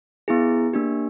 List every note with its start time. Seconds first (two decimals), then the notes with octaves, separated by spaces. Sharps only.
0.28 B3 E4 G#4
0.73 A#3 D4 G4